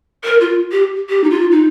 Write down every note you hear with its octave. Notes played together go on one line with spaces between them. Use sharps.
A#4
F4
G4
G4
D#4
F4
D#4